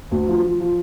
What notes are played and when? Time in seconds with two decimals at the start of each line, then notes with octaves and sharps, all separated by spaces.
0.11 D2
0.28 F3
0.44 F3
0.60 F3